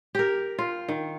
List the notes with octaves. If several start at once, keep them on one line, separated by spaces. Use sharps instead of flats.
G4 A#4
F4
D#3